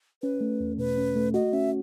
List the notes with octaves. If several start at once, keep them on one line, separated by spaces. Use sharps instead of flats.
C#4 B4
A3
E2
B2 B4
C#4
A3
F#4 D#5
C#4 E5